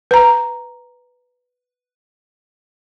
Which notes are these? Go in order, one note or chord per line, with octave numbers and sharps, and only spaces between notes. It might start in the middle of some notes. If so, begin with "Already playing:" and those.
B4 A#5